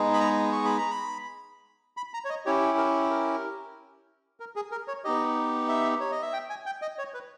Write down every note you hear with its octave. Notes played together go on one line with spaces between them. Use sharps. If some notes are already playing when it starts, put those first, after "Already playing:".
Already playing: G#3 B3 D#4 G#4
B5
A#5
C#6
B5
A#5
B5
B5
A#5
C#5
D#5
C#4 E4 G4 C#5
A#4
A#4
A#4
G#4
A#4
C#5
B3 D#4 G4 D#5
E5
C#5
D#5
E5
G5
G#5
G5
D#5
C#5
B4